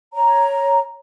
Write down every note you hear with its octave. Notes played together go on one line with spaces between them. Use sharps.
C#5 A#5